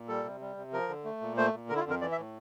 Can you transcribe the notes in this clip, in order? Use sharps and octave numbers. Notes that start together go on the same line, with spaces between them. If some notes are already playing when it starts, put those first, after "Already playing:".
Already playing: A#2
G3 A4
C3
G3
C3
F3 A#4
D3
A3
A#2
A3 C5
A#2
D3 A#4
E4
F4
F2
A#4
E3 D5
E5
A2